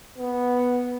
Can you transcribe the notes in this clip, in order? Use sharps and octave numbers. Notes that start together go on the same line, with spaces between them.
B3